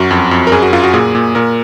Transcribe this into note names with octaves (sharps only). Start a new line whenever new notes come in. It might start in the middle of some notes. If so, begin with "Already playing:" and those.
Already playing: F#2 F#4
F2
F2
A#4
F#2 G#4
F#4
F#2 F4
F#4
A#2 G#4
A#2
A#2 A#4